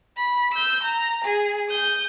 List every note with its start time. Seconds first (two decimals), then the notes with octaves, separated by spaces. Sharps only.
0.17 B5
0.54 E6 G6
0.83 A#5
1.25 G#4
1.70 D#6 G6